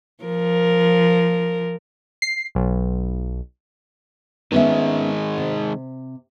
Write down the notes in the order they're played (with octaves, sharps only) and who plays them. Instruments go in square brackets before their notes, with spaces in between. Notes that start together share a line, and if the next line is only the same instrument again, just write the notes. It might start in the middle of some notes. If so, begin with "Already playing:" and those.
[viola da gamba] F3 A#4
[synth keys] C7
B1
[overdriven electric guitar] D#3 G#3 [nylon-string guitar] B3 C#4 E5
[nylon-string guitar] C3